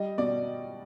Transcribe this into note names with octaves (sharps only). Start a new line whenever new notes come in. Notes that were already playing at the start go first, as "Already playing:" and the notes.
Already playing: G3 D#5
B2 D5